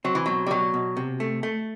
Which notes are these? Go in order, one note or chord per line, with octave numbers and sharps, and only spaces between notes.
F#3 C4
E3
B2 F#3
G3
B2 F#3
B2
C3
A3
A3